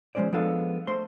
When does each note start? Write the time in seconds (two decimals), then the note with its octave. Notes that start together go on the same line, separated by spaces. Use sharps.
0.15 F3 G#3 A3 C#4 C5 D5
0.33 F3 G#3 B3 D4 A4 F5
0.87 A3 C5 C6